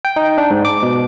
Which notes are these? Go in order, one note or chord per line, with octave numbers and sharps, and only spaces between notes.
G5
D#4
D4
G#2
D6
B2